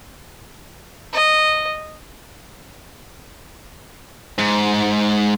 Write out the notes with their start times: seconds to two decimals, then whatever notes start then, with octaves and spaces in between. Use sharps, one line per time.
1.14 D#5
4.39 G#2